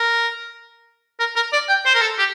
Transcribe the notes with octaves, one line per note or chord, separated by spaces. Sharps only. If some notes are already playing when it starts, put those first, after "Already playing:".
Already playing: A#4
A#4
A#4
D5
G5
C5
A#4
A4
G4